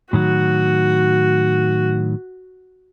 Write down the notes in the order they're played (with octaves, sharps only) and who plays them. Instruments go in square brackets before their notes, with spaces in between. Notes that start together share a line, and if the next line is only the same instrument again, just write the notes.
[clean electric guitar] A2 D#3 F#3 [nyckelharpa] F#4